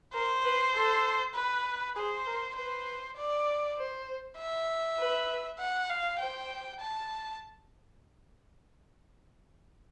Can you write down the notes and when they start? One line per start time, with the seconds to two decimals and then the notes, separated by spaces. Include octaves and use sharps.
0.14 A#4 C5
0.44 B4
0.74 A4
1.35 B4
1.96 G#4 C5
2.27 A#4
2.56 B4 C5
3.18 D5
3.77 C5
4.38 E5
4.99 B4
5.59 F#5
5.90 F5
6.19 C5 G5
6.80 A5